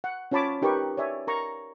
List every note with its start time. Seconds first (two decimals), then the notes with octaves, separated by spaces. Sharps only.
0.04 F#5
0.31 C#4 F4 C#5 A5 B5 D6
0.62 D#4 G4 A#4 B4 C#6
0.97 C#5 D5 E5 G#5
1.27 A#4 A#5 C#6